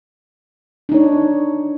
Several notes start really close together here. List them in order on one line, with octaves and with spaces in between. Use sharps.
D4 D#4 C#5